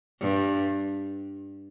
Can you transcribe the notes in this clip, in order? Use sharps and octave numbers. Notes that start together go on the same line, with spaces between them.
G2